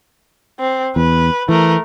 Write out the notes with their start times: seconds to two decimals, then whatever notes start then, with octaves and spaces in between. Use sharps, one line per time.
0.60 C4
0.96 E2 B4
1.49 E3 A3 A#4